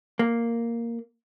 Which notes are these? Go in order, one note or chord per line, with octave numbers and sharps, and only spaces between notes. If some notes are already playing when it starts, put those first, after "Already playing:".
A#3